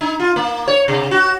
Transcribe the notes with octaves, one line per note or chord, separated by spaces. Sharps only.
D#4
F4
A#3
C#5
C3
F#4